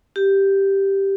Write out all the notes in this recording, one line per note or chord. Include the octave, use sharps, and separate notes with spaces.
G4